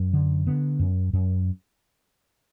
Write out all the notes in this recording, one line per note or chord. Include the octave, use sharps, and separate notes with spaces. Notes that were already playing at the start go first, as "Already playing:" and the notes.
Already playing: F#2
D3
D3 B3
F#2
F#2